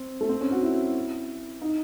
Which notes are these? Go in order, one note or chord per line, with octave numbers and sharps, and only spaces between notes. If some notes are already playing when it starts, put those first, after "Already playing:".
Already playing: C4
A3
C4
C#4
F#4
E4
D#4